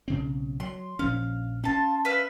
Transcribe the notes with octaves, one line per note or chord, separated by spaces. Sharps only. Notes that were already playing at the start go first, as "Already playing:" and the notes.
B1 C#3 C4
F#3 C6
A#1 F3 C#4 F5
C#4 F4 A5
B4 E5 F5